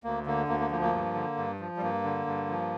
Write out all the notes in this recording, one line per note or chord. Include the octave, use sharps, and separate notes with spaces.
D2 A#3
D3 A#3
D2 A#3
A#3
F3 A#3
A#3
G2
D3
G2
F3
G3
G2 A#3
D3
G2
F3